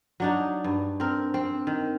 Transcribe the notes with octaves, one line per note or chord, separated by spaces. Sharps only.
F#3 D4 D#4
G2
C4 A#4
C4
D#3